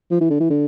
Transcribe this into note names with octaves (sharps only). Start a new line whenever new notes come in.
F3
E3
D3
E3
D3